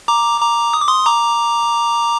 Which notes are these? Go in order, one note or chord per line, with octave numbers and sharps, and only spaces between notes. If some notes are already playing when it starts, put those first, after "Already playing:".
A#5 D6
A#5 D6
D#6
D6
C6 D#6
A#5 D6